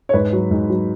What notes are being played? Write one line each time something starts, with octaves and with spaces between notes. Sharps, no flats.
C#5
G#2 B4
F#3
G#2
F#3